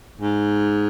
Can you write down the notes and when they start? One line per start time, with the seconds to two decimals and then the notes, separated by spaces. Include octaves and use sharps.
0.21 G#2